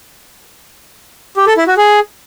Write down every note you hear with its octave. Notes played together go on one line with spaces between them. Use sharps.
G4
A4
E4
F#4
G#4